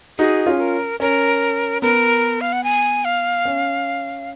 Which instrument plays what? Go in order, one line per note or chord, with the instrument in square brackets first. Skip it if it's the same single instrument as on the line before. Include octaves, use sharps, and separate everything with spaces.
[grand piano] D#4 F#4 [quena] G#4
[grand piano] C#4 F4
[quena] A#4
[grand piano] C#4 [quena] A#4
[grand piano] B3 [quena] A#4
[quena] F5
F#5
G#5
F5
[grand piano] C#4